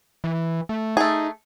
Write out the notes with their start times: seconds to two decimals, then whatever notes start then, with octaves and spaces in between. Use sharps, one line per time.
0.24 E3
0.69 A3
0.97 A3 D#4 G#4